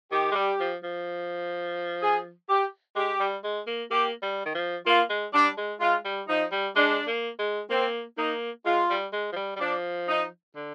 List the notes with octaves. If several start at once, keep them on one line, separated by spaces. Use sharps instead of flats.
D#3 G4
G#3
G3
F3
F3
G#4
G4
G#3 G4
G3
G#3
A#3
A#3 G4
G3
D#3
F3
A#3 F4
G#3
G3 D4
G#3
G#3 F4
G3
F3 D#4
G3
G#3 D4
A#3
G#3
A#3 C4
A#3 D#4
G#3 F4
G3
G#3
F3
G3
G3
F3 D4
D#4
D3